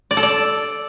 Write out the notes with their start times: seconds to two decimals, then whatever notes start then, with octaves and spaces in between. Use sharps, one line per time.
0.11 D5
0.17 A4
0.23 D5